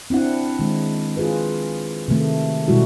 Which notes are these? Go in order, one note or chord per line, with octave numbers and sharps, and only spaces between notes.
C4 D4 E4 F#5
D#3 G#3
F4 G#4 B4
C3 D#3 A3
B2 G3 G#3 E4 F#4